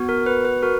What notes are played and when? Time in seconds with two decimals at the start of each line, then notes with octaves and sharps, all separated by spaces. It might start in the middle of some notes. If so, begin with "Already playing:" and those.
Already playing: B3 F#4
0.09 A#4
0.26 B4
0.45 B4
0.63 F#4 A#4